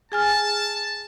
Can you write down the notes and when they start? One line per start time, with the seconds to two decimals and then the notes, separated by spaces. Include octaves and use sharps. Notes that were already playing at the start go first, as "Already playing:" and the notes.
0.12 G#4 G#5 A5 F6